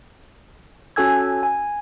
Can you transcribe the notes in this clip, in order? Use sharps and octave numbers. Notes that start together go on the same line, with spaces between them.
C#4 F#4 A4 G#5 E6 G#6
G#5